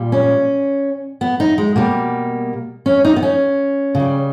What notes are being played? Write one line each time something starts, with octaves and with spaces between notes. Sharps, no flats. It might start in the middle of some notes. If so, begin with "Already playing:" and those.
Already playing: A#2 G3
C#4
B3
D#4
G#3
B2 G3 A#3
C#4
D#4
B3
C#4
C#3 G3